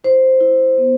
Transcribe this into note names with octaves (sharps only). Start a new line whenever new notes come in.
E4 C5
E4
B3